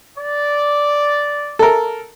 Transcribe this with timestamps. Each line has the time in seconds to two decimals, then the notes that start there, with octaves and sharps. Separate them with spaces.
0.17 D5
1.59 A4 A#4